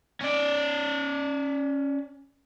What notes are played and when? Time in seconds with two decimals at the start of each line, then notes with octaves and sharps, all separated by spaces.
0.21 C#4 D5